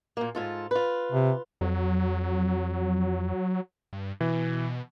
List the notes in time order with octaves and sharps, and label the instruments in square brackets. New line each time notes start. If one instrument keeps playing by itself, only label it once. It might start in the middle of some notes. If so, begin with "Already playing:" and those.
[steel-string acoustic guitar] A#2 A#3
G#2 F4 A4
F4 B4
[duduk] C3
[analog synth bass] F2 [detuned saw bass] F#3
[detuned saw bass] G2
[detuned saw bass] B2 [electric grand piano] E3